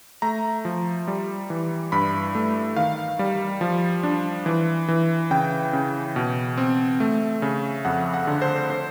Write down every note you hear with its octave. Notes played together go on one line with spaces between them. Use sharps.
A3 A#5
F3
G3
E3
G2 B5
A3
D#3 F5
G3
F3
D4
E3
E3
C#3 G5
C#3
B2
C4
A3
C#3
F2 F#5
F#5
D3
C5
C5